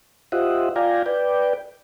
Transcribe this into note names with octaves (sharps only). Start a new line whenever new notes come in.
F4 G4 C5 D#5 E5 F#5
F4 D5 F5 G5 G#5 A#5
B4 D5 G5